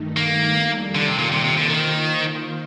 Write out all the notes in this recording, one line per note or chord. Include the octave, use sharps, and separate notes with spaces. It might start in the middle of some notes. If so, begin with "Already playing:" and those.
Already playing: G2 D#3 A3 D#4
A#3
F2 D#3 G3 D4 A4
D3
C3
A#2
C3 D#3 A#3 F4 C5
C3
D3
D#3